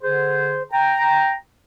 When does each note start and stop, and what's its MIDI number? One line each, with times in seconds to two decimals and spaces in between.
0.03 0.62 50
0.03 0.62 68
0.03 0.62 72
0.72 1.33 79
0.72 1.33 82